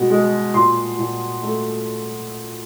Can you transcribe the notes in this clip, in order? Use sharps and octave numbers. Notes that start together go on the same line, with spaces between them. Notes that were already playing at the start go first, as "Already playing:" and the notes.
Already playing: B2 G#3
G#3
A#2 C6
A#2
A3